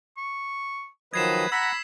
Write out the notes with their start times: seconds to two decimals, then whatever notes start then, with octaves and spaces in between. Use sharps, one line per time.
0.17 C#6
1.14 D#3 F3 F#3 B4 D#5 G#6 C7 E7
1.52 F#5 A#5 B5 E6 B6